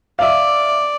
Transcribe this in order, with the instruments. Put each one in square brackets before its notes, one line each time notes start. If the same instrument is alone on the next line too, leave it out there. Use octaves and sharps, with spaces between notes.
[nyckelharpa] D5 [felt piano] E5 F5